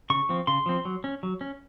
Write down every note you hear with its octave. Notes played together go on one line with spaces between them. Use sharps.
C#3 C#6
F3 C4
C#3 C6
F3 C4
F#3
C#4
F#3
C#4